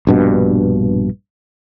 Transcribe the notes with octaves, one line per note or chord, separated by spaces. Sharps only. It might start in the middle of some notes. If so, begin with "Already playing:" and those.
A#1 G2 B2